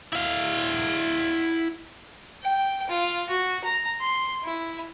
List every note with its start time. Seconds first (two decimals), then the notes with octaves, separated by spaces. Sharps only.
0.13 E4 F5
2.43 G5
2.90 F4
3.30 F#4
3.64 A#5
4.01 C6
4.44 E4